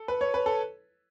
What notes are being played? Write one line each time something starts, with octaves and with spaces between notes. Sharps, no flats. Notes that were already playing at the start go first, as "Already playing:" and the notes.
Already playing: A4
B4
C#5
B4
A4